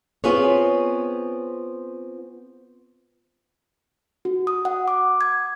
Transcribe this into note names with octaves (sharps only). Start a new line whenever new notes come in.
B3 C4 F4 G#4 B4 C#5
F#4
D#6
F#5
D6
G#6